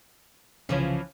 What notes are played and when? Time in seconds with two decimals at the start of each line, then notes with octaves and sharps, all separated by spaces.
0.69 C2 C#3 E3 F3 C#4